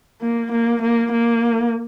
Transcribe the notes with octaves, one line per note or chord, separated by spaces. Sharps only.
A#3
A#3
A#3
A#3